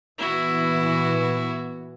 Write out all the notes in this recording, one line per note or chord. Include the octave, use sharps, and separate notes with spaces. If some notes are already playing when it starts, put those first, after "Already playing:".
A#2 E3 B3 E4 F#4